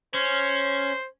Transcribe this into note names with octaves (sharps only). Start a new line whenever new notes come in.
C#4 C5